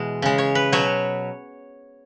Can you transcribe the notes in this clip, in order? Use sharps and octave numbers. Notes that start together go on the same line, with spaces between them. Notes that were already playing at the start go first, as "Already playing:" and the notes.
Already playing: B2 E3 G#3
C#3 G#3
C#5
B4
B2 F#3 C#5